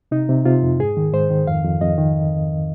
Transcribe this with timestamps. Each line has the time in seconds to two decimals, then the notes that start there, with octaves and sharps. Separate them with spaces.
0.11 C3 D#4
0.29 C3
0.45 C3 F4
0.62 F2
0.79 G#2 G#4
0.97 D#3
1.13 G#2 C5
1.30 D#3
1.47 F2 F5
1.64 F2
1.81 F2 D#5
1.98 D#3